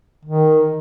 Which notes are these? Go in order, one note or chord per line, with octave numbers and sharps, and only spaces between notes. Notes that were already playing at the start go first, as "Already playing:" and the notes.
D#3